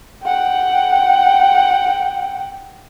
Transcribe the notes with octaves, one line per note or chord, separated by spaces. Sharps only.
F#5 G5